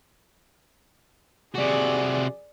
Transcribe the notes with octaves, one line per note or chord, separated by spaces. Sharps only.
C3 F#4 G#4 D5